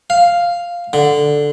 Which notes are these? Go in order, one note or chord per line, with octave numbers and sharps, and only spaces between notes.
F5
D3